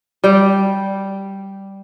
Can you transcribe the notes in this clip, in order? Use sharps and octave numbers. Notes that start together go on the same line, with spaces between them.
G3 G5